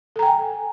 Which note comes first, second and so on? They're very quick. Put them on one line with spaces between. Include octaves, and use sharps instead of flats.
A4 A#5 G5 G#5